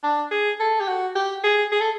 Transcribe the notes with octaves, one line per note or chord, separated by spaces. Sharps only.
D4
G#4
A4
G4
F#4
G4
G#4
G#4
A4